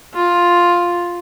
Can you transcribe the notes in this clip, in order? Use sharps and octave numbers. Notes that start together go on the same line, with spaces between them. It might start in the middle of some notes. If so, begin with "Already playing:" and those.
F4